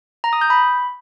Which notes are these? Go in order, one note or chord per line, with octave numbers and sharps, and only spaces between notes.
A#5
D#6
G6
B5